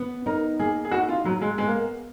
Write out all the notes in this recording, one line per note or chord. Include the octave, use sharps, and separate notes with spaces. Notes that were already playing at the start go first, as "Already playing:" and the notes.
Already playing: B3
D#4 A#4
A#3 G#4
G#4
D#4 F#4
F4
F#3 A#3
G#3
G#3 B3
A#3